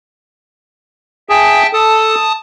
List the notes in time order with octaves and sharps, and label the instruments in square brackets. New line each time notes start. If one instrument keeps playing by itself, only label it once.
[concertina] G#4 [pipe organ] E5 G5 A5
[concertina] A4 [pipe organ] A5 D#6